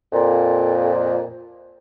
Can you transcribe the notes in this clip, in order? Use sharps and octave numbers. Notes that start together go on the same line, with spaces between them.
F2 A#2